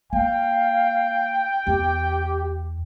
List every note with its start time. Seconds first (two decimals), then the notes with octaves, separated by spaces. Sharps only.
0.13 A#3 F5 G5
1.67 E2 G4